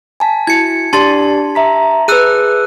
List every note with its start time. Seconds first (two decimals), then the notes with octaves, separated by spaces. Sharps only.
0.20 G#5 A5 B6
0.47 E4 F#4 G#6 C#7
0.93 D4 G4 D5 A5 C6 A6
1.55 E5 A#5 B6
2.08 G#4 B4 E6 F#6 D#7